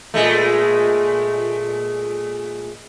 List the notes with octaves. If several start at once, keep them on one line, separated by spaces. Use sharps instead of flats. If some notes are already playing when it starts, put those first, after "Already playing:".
A#2 G#3 A3